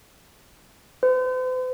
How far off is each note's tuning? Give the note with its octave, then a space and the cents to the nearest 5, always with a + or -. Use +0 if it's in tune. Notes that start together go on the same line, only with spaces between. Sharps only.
C5 -45